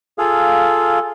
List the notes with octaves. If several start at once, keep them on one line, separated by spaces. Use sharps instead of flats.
F4 G#4 A4 F5